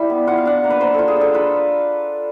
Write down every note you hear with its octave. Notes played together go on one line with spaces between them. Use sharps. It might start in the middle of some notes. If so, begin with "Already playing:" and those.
Already playing: G3 E4
B3
F4 F#5
F5
D4 F#5
A#3
B4
A#3 C5
F4 A4
G#4
D4 A4
F4 B4